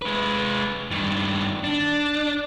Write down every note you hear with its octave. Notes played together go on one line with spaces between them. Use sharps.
G#3 B4
G2 D#3
D4